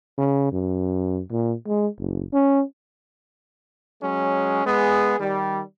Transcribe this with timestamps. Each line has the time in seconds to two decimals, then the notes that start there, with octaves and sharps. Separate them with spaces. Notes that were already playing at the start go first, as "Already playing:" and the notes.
0.18 C#3
0.52 F#2
1.31 A#2
1.67 G#3
1.99 F#1
2.33 C#4
4.02 F#3 G#3 C#4
4.65 G#3 B3 G#4
5.19 D#3 G3